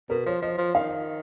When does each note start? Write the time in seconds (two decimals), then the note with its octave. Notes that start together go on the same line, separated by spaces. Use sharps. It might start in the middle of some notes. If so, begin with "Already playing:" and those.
0.10 B2 A#4
0.26 F3 C#5
0.42 F3 D#5
0.58 F3
0.75 D#3 F5